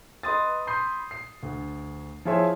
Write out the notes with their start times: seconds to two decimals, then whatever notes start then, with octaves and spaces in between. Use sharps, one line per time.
0.23 B4 D#5 C6 D#6 A6
0.67 B5 C6 D#6 G6 C7
1.11 C7
1.43 D2
2.25 F3 E4 G#4 C5 C#5 E5